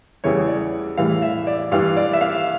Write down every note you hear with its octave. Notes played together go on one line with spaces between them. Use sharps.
E2 C#3 E3 G3 C#5
D5
A2 E3 G3 F5
E5
D5
G2 E3 G3 F5
D5
E5
F5